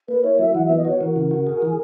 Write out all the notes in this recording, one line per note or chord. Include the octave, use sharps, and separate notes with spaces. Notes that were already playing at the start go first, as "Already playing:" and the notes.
A#3 B4
E4 C#5
F#3 E5
E3 F#5
B3 E5
D#5
F#4 C#5
E3 A#4
C#3
F#4
G#4
E3